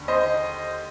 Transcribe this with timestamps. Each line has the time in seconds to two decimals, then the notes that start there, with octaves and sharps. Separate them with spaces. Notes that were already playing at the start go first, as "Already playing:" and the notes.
Already playing: D#2 D3
0.08 C5 D#5